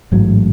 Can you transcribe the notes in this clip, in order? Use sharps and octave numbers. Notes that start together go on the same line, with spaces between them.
A1 G#2 F#3